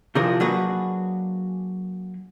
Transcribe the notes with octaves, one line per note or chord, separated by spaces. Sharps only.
C3 E3 F3 D4 G#4 A#4
F#3 A#3 D4 F#4 G#4 B4